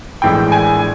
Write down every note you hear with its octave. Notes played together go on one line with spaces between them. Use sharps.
A#1 A2 E3 G#3 G5
G#5